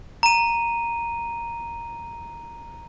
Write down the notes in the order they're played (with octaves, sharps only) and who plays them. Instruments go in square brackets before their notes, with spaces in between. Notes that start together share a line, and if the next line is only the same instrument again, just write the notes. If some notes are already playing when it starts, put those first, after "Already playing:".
[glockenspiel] A#5 D#7